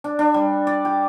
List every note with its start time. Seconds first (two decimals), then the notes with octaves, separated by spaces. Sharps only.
0.04 D4
0.19 D4
0.34 G3
0.67 D5
0.85 G4